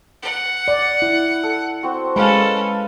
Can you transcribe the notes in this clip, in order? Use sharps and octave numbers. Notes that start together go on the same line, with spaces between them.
F#5
D5
E4
A4
C4 F#4
G#3 C#4 A4 B4 F5